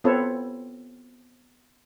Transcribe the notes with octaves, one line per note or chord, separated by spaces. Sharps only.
B3 C4 F4 A4 B4 C#5